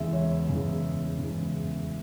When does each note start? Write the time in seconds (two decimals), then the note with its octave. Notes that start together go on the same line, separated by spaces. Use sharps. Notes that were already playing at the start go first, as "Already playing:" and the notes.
Already playing: E2 C#3 G#3 E5
0.13 C#5
0.48 E2 C#3 G#3
1.18 E2 C#3 G#3